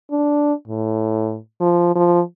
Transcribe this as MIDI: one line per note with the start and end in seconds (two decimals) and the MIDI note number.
0.11 0.53 62
0.68 1.38 45
1.61 1.92 53
1.95 2.20 53